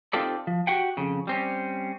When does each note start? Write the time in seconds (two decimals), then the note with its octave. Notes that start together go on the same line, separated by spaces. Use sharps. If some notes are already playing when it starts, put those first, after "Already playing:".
0.13 C4 D#4 F4 G4 A4 D5
0.47 F3
0.67 F#4 G4 F#5 G5
0.97 F2 C#3
1.27 G3 C4 C#4